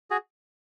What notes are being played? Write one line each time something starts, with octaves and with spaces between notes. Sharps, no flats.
F#4 G#4